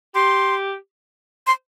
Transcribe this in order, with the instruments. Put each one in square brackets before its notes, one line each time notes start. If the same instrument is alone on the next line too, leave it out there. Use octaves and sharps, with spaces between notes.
[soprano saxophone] G4 [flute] C6
[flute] C6